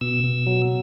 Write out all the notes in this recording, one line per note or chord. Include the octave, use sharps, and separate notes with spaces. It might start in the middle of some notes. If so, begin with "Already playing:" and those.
B2 E6
B2
F#3